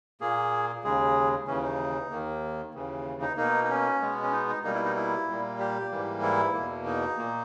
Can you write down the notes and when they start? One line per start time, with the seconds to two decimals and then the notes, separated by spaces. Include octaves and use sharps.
0.21 A#2 A#3 G#4
0.84 D#2 C#3 G#3 G#4
1.47 D#2 C#3 E3 C#4
1.63 D#4
2.11 D#2 D#3 A#3
2.74 D#2 C#3 E3
3.22 D#4
3.37 B2 A#3 D#4
3.64 D#4
3.69 C#4
4.01 B2 G#3 B3
4.23 C#4
4.32 D#4
4.48 D#4
4.64 B2 G3 A#3 D#4
4.74 E4
4.85 D#4
4.96 E4
5.27 A#2 G3 A#3
5.59 G4
5.90 G#2 E3 G3 A#3
6.22 E4
6.54 E2 B2 A#3
6.86 D#4
7.17 A#2 A#3